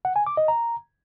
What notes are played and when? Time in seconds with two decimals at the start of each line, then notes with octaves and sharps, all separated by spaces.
0.05 F#5
0.16 G#5
0.27 D6
0.37 D#5
0.48 A#5